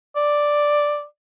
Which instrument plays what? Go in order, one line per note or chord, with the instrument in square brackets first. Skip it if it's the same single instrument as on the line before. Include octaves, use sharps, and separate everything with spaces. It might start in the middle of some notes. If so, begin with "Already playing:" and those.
[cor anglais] D5